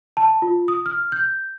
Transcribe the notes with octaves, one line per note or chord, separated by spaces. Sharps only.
A5
F4
D#6
F6
G6